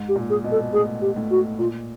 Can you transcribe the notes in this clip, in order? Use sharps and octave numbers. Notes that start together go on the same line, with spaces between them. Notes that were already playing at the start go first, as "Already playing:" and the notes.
Already playing: G#2
G4
A#2
G#4
B2
A4
A2 G#4
G4
A2
F#4
A#2 F4